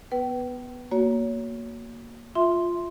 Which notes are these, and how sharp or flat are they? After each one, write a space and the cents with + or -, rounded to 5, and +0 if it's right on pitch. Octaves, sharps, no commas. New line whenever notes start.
B3 -5 B4 +0 G5 -40
A#3 +0 F#4 +0 C#5 +25
F4 +0 E5 +0 C6 +0